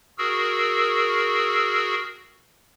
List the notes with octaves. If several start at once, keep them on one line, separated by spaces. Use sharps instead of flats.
F#4 G#4 A#4 E6